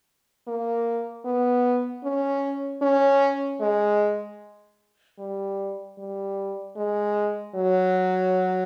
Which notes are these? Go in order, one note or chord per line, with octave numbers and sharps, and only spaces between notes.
A#3
B3
C#4
C#4
G#3
G3
G3
G#3
F#3